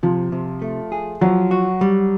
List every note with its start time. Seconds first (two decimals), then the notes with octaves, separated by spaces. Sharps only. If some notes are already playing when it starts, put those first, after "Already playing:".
0.03 C3 F3
0.32 C3
0.62 A3
0.92 G#4
1.21 F3 F#3
1.51 F#4
1.81 G3